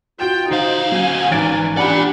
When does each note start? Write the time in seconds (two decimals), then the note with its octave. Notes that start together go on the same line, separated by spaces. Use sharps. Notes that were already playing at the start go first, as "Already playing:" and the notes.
0.20 F4 F#4 G5 E7
0.51 D2 D#4 C5 F5
0.92 F#3 C#4 G#5
1.31 G#1 E3 A6 D7
1.77 D4 F4 G4 D5 F#5 G#5 B5